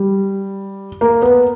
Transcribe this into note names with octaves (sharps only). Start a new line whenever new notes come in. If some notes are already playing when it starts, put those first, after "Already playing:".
Already playing: G3
A#3
B3